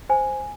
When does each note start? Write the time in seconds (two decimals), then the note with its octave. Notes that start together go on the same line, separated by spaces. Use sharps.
0.09 C5 G#5